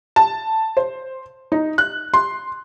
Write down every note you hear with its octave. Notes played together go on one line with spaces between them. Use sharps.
A5
C5
D#4
F#6
C6